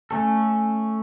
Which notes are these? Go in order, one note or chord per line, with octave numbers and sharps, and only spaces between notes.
A3 C#4 A4